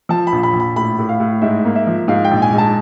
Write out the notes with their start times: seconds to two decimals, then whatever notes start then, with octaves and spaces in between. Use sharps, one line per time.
0.09 F3 A5
0.27 B5
0.32 A#1
0.43 B5
0.53 A#1
0.60 B5
0.76 A2 B5
0.99 A2
1.09 F5
1.20 A2
1.42 G#2 E5
1.65 A#3
1.76 E5
1.87 F3
2.08 G#2 F5
2.25 G5
2.31 A#1
2.42 G#5
2.53 G#2
2.58 A5